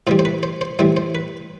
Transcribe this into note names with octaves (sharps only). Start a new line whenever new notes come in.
A2 E3 G3 C5
C5
B4
C5
C5
A2 E3 G3 C5
C5
B4